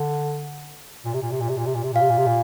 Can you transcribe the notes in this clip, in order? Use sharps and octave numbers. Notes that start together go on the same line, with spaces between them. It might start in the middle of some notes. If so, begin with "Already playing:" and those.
Already playing: D3
A#2
C3
A#2
C3
A#2
C3
A#2
C3
A#2
C3
A#2 F5
C3
A#2
C3
A#2